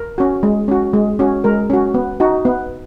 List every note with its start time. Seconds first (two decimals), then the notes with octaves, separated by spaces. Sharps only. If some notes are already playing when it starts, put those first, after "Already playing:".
Already playing: A#4
0.18 C#4 F#4
0.43 G#3
0.68 C#4 F#4
0.93 G#3
1.19 C#4 F#4
1.44 G#3 A#4
1.70 C#4 F#4
1.94 B3
2.20 D#4 F#4
2.45 B3